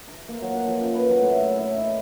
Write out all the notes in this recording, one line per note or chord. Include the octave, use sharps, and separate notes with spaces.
A#5
A#3
F#3
F#5
F3
F#2
B4
F#3
A2
E5
E4
D#4